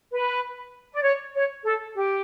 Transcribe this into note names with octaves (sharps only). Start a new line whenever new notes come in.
B4
D5
C#5
C#5
A4
G4